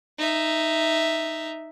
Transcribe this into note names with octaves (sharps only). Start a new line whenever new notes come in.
D#4 E5